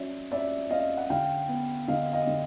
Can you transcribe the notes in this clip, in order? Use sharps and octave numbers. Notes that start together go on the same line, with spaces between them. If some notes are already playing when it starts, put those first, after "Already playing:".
Already playing: F#3 C#4 D5 E5
C#4 D5 E5
C#4 D#5 F5
F#5
D3 F5 G5
B3
D3 D#5 F5
D#5 F5
D3